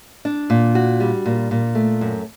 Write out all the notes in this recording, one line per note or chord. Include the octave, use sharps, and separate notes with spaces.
D4
A#2
F#4
G3
A#2
A#2
A3
F#2